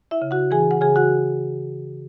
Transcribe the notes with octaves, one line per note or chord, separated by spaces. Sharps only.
E4 E5
C#3
F#4 F#5
E3 G#4 G#5
F#5
C#3 G#4 G#5
F#4 F#5